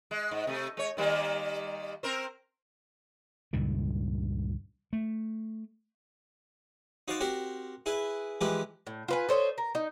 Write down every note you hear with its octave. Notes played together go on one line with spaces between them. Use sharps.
G#3
G#2
C3 A3
G#3 C#5
D#3 G3 A#3
C4 A#4 C5
C#2 G2 A#2 D#3
A3
D#4 F#4 C5 F5 A5 D6
C4 F#4 G4 A#4 C5
E4 G#4 B4 E5
E3 F3 G#3 G4 B4
A2
F4 B4 G#5
A4 C5 C#5 D#5
A#4
D#4